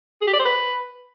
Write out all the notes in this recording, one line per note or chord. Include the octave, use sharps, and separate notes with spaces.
G#4
G4
D5
C5
B4